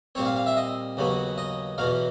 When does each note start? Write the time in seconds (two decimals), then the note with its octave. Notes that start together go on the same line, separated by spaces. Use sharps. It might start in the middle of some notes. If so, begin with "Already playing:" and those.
0.15 A#2 G3 C4 C#5
0.25 F5
0.36 F5
0.46 E5
0.57 D#5
0.97 D#2 C#3 F#3 B3
1.38 D#5
1.78 E2 B2 F#3 F5